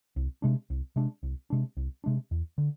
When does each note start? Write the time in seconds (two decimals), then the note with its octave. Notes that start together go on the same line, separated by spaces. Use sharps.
0.16 C2
0.42 C3 G#3 D4
0.70 C2
0.96 C3 G#3 D4
1.23 C2
1.50 C3 G#3 D4
1.77 C2
2.04 C3 G#3 D4
2.31 E2
2.58 D3